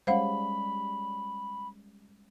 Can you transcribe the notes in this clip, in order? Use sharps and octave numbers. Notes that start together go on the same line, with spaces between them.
G3 G#3 C#4 C5 F5 F#5 B5